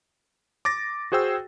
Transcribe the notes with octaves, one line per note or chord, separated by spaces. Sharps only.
D6 A6 A#6
F#4 G#4 C5 G5 E6